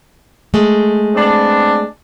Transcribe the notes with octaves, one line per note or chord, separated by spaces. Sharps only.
G#3 A3
B3 C4 D4